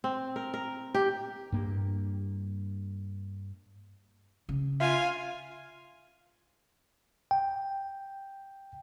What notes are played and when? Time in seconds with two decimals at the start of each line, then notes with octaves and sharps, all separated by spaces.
0.04 C4
0.36 A#4
0.54 A#4
0.94 G4
1.52 G2 A#3
4.49 C#3
4.80 F4 E5 F5 G#5
7.31 G5